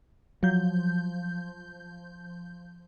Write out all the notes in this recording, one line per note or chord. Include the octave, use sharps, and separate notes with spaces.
F3 F#3 G6